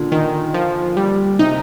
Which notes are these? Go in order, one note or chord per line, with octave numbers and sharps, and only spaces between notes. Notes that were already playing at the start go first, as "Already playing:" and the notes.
Already playing: A#2 D3
D#3
F3
G3
C3 D#4